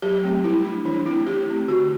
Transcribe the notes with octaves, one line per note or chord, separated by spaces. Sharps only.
F#3 G4
A3 C4
G3 E4
D4
E3 D4
A3 C4 E4
E3 G4
A3 C4
D3 F#4